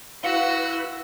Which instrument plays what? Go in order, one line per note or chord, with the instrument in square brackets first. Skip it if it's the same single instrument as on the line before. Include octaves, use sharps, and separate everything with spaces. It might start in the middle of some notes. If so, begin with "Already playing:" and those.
[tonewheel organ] E4 B4 [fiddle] F#4 E6 [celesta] F5 C#7